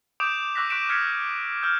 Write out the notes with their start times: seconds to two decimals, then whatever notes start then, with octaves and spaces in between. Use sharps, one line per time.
0.20 D6 D#6 G6 D7 E7 F7
0.55 C#6 D6 E6 F#6 A#6 B6
0.70 C#6 F#6 B6 D7 E7
0.89 F6 G#6 B6 C#7
1.63 E6 F6 G6